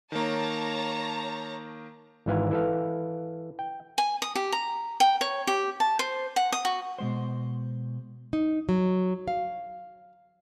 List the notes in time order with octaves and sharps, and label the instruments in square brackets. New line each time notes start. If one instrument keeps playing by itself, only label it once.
[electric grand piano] D#3 A#3 [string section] C#5 A5 A#5
[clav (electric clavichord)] G#1 G#2 E3 F5 G#5
E3 A4 F5
G5
[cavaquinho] G#5
D#6
G4
A#5
G5
C#5
G4
A5
C5
F#5
D#6
F#4
[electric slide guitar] B2 G#3 C5
[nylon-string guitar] D#4
F#3
F5